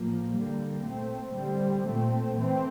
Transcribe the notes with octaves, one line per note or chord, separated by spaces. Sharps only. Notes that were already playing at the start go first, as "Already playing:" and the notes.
Already playing: A2 F3 A#3
D3 G3 A#3
A#2 A3 C4
D3 G3 C4
A#2 A3 C4
E3 A3 C4